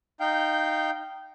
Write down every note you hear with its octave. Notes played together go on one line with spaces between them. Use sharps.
D#4 F5 G5 G6